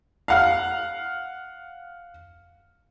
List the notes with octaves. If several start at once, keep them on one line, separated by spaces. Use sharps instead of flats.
F5 F#5 F6